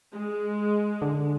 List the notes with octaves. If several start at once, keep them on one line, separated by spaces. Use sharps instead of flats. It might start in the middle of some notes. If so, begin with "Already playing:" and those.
G#3
D3